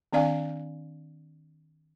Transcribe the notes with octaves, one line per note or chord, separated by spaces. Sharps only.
D#3 C4 D4 D5 F5 G#5